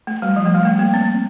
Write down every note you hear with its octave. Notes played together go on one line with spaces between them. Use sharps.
A3
G3
F3
A3
G3
A3
A#3
C4